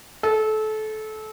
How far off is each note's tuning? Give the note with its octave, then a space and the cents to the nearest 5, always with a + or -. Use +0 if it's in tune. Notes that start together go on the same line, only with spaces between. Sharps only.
A4 -25